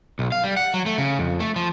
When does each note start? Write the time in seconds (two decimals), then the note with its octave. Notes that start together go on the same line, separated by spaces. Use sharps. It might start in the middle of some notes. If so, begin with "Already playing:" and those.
0.19 B1
0.32 F5
0.44 G3
0.57 F#5
0.74 F#3
0.86 A3
0.98 C#3
1.19 F2
1.40 A3
1.56 F3